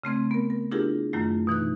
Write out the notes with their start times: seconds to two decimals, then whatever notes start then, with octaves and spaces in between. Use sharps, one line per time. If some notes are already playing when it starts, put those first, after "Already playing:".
0.04 C#3 A3 C4 G#6
0.31 B3 A#4
0.50 A#4
0.71 D4 E4 F4 G4 G#4 A#4
1.13 F#2 D#3 F#3 A3 E4 F4
1.47 B2 E3 D#4 F#6